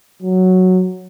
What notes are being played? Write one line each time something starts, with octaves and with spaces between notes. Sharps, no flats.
F#3